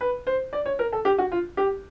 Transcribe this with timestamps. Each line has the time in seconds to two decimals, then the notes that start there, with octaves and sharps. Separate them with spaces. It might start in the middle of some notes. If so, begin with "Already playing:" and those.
0.01 B4
0.27 C5
0.53 D5
0.66 C#5
0.79 A#4
0.92 A4
1.05 G4
1.18 F#4
1.32 F4
1.57 G4